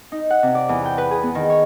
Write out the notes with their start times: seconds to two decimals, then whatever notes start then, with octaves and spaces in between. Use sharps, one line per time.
0.12 D#4
0.30 F#5
0.43 C3
0.55 D5
0.69 E2
0.86 G5
0.98 B4
1.11 G#4
1.23 B3
1.35 D#3
1.50 C#5